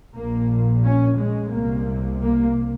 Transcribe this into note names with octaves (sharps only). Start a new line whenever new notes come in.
A#1 A#2 A#3
C#4
G#3
C2 C3 A#3
A#3